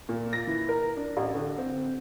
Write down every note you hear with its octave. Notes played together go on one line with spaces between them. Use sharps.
A#2
A#6
E3
A#4
D4
A1
D3
C4